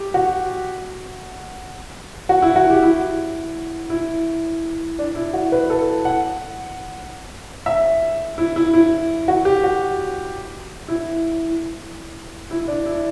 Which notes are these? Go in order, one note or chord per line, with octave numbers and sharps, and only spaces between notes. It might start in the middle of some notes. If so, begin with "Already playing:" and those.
Already playing: G4
F#4
F#4
E4
F#4
G4
E4
E4
D4
E4
F#4
B4
A4
F#5
E5
E4
E4
E4
F#4
G4
F#4
E4
E4
D4
E4